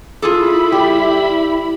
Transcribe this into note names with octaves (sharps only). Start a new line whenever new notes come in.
E4 F4 G#4 A4 B5
G3 G4